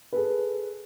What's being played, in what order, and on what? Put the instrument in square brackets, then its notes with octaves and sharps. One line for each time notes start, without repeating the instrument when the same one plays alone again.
[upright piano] G#4 A4 B4